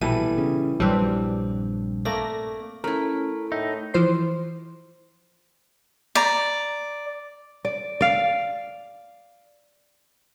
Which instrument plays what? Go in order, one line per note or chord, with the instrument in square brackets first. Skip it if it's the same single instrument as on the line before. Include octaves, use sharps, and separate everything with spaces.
[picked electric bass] A#1 [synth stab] B2 D#7 [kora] E3 G3 A4
[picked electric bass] C#3
[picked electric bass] A#1 G2 [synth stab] E3 F#3 G3 [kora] C4 D4
[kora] A3 A#3 D5 [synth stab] A#6
[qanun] A3 E4 [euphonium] C#4 [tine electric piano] A#4
[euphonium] A2 [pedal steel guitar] D#4 [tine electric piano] E5
[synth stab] E3 F3 C5 C6
[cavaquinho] D5 A#5
[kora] D5
D5 F5